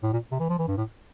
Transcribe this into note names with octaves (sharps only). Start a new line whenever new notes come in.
A2
A#2
C3
E3
F3
E3
G2
A2